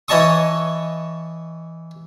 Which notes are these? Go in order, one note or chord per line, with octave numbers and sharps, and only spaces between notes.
E3 C#5 D#5 A5 C#6 D#6